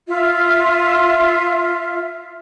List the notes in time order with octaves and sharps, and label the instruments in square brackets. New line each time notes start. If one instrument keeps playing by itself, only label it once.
[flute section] F4 E5